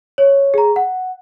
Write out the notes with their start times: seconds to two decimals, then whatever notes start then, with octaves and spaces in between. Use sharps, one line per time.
0.18 C#5
0.54 G#4 A#5
0.76 F#5